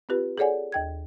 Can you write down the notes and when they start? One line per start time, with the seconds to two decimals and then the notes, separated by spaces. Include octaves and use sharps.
0.09 C4 F4 G4 B4
0.38 G#4 A4 C#5 D5 F#5 G#5
0.72 D#2 G5 G#6